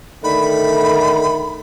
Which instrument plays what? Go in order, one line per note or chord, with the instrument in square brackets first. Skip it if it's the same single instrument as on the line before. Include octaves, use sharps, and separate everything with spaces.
[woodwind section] D3 D#3 [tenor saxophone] A3 [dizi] B5